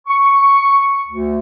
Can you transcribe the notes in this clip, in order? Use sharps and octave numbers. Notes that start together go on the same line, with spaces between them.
C#6
D2